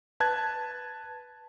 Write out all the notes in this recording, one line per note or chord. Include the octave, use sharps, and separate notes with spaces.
B4 A5 F#6 G#6